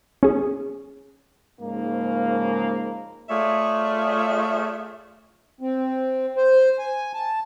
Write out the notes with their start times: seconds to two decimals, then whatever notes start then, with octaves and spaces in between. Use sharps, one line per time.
0.23 C#4 G#4
1.61 G#2 C#3 F3 A#3
3.30 A3 F4 G#4 C#5 D5 E5
5.61 C4
6.37 C5
6.79 G#5
7.14 A5